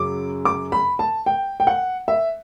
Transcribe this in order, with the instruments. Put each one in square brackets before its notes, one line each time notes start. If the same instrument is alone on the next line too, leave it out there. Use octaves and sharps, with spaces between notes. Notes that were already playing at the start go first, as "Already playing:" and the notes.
Already playing: [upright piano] F#2 C#3 F#3 D6
D6
B5
A5
G5
G5
F#5
E5